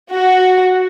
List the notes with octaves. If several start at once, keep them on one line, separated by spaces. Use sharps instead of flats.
F#4